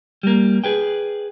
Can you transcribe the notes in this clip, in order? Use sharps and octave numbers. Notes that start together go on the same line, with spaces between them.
G3 A#3
G#4 B4 G5